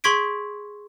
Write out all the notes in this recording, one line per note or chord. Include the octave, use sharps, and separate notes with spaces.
G#4 C6 C#6 G#6 B6 D7